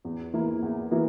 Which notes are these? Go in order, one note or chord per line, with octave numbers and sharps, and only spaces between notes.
E2
E3 A#3 E4
E2
E3 A#3 E4